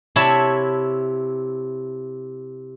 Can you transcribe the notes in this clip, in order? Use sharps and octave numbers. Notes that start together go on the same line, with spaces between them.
C3 E4 C#5 E5 A5